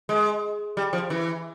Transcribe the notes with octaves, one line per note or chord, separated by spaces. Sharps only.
G#3
G3
F3
E3